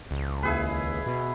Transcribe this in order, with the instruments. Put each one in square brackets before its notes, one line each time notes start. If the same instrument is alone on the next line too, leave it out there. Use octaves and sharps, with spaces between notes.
[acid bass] C#2
[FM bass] D#2 [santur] E4 G#4 B4
[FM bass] B2